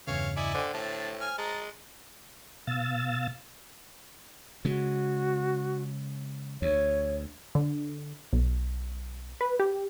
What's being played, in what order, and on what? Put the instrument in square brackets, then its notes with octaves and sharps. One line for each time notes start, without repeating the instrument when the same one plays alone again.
[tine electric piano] E2 G2 C#3 [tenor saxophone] E3 [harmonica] C#5 F5
[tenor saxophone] E4 [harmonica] D5 D#5 G#5
[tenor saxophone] D3 [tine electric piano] C5 G5
[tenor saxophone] A2 [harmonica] D3 A5
[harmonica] G#5 F6
[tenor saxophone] G#3 [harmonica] A5 A#5
[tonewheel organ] B2 F5 E6 A6
[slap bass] C#3 G#3 [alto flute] F#4
[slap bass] D2 [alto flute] C#5
[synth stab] D3
B1
B4
G4